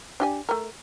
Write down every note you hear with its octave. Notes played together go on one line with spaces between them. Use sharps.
D4 G4 G#5
A3 A#4